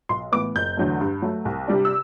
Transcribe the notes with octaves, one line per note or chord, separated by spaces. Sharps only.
B1 C6
A2 E3 B3 D6
F#1 G6
E2 D3 F#3 A3
G2
F#3 A3
C2
C3 G3 D4
E6